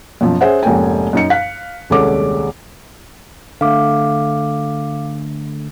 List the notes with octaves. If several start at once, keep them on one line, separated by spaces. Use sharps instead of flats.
F#2 B2 F3
C#4 G#4 C5 E5 F#5
F1 G#2 A#3 C#4 G5 G#5
F#2 D#4 C#7
F5 F#6 B6
D#1 C2 G#3 C#4 A4 D6
D3 A3 F5 D6